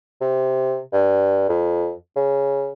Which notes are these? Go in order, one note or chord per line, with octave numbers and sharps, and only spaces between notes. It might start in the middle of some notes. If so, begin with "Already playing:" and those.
C3
G2
F2
C#3